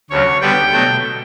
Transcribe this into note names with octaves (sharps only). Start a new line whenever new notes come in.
D2 C#3 F#3 C#5
D3 G3 B3 G5
B2 F#3 A3